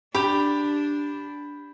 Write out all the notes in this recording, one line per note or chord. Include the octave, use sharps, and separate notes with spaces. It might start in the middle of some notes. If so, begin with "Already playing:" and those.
D4 G4 B5 G6